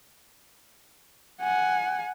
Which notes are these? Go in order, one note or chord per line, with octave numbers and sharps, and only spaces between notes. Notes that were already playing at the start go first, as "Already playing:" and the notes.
F#5 G#5